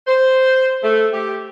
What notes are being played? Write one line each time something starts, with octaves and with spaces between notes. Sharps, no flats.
C5
A3
G4